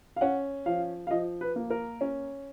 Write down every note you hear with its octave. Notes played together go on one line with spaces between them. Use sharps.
F5
C#4 F#5
F3 F5
F5
F3 D#5
B4
A#3
A#4
C#4